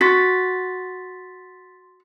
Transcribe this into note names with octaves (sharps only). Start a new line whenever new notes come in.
F#4 C6 A6 B6